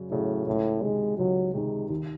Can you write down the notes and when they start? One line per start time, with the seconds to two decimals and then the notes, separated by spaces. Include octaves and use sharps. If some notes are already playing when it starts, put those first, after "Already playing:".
Already playing: F#2 C#3 F#3
0.10 A2 C#3 F#3
0.47 C#2 A2
0.82 C3 D#3 G#3
1.18 C#2 F#3
1.54 C3 D#3 G#3
1.90 D#2